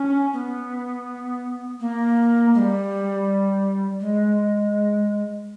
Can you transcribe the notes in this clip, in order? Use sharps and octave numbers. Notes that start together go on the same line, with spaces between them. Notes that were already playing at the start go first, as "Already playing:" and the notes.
Already playing: C#4
B3
A#3
G#3
G3
G#3